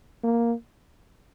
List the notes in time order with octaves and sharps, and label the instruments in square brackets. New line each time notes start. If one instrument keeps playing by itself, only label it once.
[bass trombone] A#3